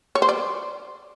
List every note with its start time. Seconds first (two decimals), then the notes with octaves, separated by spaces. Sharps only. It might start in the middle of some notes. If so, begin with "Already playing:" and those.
0.15 C#5
0.22 C5
0.29 D5